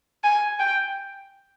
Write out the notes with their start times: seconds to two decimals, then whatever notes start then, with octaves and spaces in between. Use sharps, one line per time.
0.24 G#5
0.59 G5